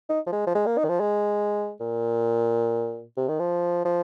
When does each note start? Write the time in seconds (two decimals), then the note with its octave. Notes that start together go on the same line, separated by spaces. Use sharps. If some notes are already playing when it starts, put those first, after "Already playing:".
0.09 D#4
0.26 F3
0.32 G#3
0.47 F3
0.55 G#3
0.66 A#3
0.78 D#4
0.84 D#3
0.89 F3
1.00 G#3
1.81 A#2
3.17 C3
3.28 D#3
3.39 F3
3.85 F3